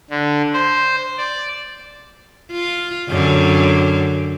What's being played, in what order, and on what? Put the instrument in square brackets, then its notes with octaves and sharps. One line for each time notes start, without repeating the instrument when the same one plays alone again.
[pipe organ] D3
C5
D5
[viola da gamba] F4
F#2 D3